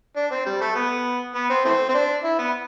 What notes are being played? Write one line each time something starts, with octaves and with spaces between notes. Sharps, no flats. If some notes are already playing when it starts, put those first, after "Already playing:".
D4
C4
G3
A3
B3
B3
C4
E3 A3 C4
C4
D4
E4
B3